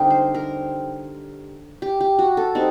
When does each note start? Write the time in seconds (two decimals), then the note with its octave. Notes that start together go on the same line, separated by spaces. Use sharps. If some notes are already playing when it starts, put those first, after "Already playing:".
Already playing: D3 G3 C4 D#4 G4 A#4
0.10 C5
0.35 A#4
1.82 G4
2.00 G4
2.19 F#4
2.37 A4
2.55 G3 C4 D#4